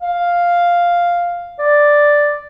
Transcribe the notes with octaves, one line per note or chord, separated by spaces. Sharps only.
F5
D5